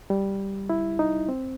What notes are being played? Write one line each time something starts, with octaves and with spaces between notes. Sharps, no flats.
G3
E4
D#4
C4